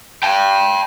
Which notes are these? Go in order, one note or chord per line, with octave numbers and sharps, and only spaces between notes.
G5 A5